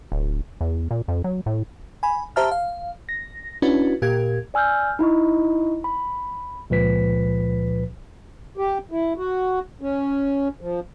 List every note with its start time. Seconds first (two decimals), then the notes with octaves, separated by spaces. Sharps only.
0.12 D1
0.61 E2
0.91 A#2
1.08 F2
1.24 F#3
1.46 A2
2.03 G#5 B5
2.36 G4 C5 E5 A5 A#5 F6
2.51 F5
3.09 A#6
3.62 C#4 D4 E4 F#4 B4
4.02 A#2 G4 A#4 G#6
4.54 D5 G#5 E6 F6 G6
4.99 D#4 E4 D#5 C#6
5.84 B5
6.70 C#2 A#2 F3 B4 B6
8.57 G4
8.91 E4
9.18 F#4
9.81 C#4
10.61 F3